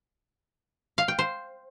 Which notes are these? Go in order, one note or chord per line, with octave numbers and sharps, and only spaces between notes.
F5
G5
C5